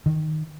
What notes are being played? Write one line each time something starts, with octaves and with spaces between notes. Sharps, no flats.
D#3